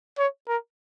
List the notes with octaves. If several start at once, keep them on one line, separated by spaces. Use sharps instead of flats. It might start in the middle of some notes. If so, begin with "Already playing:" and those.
C#5
A#4